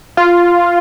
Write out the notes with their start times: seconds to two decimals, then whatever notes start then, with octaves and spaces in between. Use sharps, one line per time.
0.17 F4